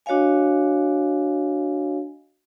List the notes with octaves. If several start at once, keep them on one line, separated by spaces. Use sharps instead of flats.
D4 F#4 C#5 D#5 F5 G#5